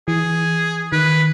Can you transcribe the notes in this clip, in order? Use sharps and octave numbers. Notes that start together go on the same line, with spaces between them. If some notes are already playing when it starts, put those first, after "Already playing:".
E3 G#4
D#3 B4